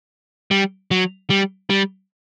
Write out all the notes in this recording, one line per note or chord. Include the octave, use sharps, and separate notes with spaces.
G3
F#3
G3
G3